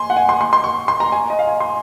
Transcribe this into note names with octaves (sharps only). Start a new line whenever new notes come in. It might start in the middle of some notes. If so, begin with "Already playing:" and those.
Already playing: G#5 C6
F#5
G#5
C6
C6
C6
C#6
C6
A#5
G#5
D#5
F5
G#5
C6